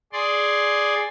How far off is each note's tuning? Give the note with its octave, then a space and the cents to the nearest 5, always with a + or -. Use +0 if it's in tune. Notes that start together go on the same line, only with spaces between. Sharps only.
G#4 +0 D5 +0 C6 +5